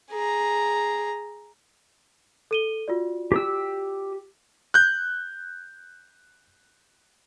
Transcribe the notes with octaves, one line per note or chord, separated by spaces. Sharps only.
G#4 A#5
A4 D#7 G7
F4 F#4 D5
G4 E6
F#6 G6